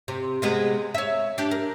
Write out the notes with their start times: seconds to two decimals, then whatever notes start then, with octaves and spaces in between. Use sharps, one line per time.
0.08 C3
0.42 C3 G#3 B3
0.94 C#5 E5
1.38 D4 G4
1.51 A#4